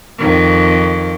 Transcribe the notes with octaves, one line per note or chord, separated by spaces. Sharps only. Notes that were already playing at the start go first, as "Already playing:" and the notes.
F2 D#3